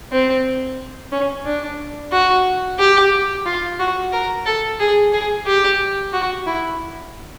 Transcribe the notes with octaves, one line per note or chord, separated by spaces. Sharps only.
C4
C#4
D4
F#4
G4
F4
F#4
A#4
A4
G#4
G#4
G4
F#4
E4